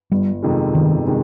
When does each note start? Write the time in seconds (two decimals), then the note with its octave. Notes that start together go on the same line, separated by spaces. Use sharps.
0.12 G1 G3
0.42 F2 C3 D#3 G#3
0.74 G1 D#3
1.07 C3 D#3 G#3